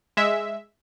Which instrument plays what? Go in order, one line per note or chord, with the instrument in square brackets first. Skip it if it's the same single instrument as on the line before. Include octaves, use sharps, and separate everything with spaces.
[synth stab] G#3 E5